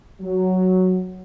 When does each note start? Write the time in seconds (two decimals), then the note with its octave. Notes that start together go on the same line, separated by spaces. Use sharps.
0.22 F#3